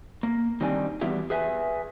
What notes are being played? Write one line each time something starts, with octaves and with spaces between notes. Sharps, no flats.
A#3
D#3 G3 C4 D4 G#5
E3 G3 B3 E4 F#4 G4
G#4 B4 E5 G5 G#5